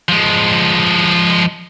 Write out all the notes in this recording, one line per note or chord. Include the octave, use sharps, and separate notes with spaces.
F3 G#3